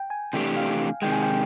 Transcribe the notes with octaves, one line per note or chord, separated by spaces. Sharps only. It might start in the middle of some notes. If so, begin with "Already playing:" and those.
Already playing: G5
G#5
C3 E3 A3 D4 G4 G5
F5
C3 D#3 G#3 G5
G#5
G5